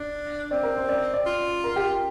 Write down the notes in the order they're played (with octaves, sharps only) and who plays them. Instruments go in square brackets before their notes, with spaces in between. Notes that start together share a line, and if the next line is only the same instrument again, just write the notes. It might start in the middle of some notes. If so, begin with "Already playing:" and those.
Already playing: [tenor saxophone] D4
[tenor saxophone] C4 [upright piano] D5
[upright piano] A#4
C5
D5
D5
[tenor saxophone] F4
[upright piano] A#4
G4